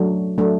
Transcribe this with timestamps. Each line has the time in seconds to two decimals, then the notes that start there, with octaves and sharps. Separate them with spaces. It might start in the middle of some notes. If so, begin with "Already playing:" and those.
Already playing: F#3 A3 D4
0.38 F#3 A3 D4